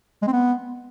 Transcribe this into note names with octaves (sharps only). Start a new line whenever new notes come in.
G#3
C4
B3